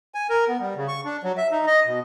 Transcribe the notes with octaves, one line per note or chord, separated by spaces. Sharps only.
G#5
A#4
B3
G3
C#3
C#6
D4
F#3
E5
D#4
D#5
B2